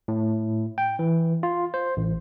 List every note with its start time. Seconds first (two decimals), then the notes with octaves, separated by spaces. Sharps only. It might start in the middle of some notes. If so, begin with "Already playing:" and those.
0.08 A2
0.78 G5
0.99 E3
1.43 F4
1.74 C5
1.97 A1